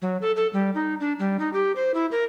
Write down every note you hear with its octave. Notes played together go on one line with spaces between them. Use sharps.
F#3
A4
A4
G3
D#4
D4
G3
D#4
G4
C5
E4
A#4